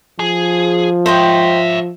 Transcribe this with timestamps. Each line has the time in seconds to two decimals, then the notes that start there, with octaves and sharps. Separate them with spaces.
0.20 F3 G#4
1.06 C5 C#5 D#5 E5 G5